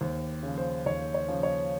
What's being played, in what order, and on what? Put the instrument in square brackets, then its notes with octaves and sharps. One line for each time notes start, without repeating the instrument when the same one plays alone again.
[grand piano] D#2 C5
C#3
F3
C5
D#2 C#5
C#5
C#3 F3
C#5